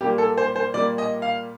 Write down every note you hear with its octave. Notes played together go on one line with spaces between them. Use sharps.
A#2 G3 A#3 G4
A4
C5
C5
A#2 G3 A#3 D5
D#5
F5